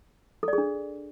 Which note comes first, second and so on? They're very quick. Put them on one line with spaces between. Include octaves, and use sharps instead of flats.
A4 D5 G#4 D4